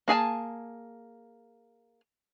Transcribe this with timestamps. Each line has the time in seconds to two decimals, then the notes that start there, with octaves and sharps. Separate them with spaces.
0.08 A#3 G#4 G#5 A5